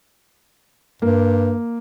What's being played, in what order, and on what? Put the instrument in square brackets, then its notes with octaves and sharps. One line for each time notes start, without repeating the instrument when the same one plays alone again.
[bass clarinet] G2 [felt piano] A#3